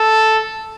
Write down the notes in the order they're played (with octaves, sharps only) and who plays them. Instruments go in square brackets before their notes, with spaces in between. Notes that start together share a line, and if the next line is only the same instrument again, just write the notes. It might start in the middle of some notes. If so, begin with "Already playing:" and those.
Already playing: [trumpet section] A4